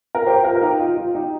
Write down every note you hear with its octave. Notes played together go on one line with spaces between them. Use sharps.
A#4
G4 C5
F4 A#4
A#4
D#4 G4
F4
F4
D#4 G4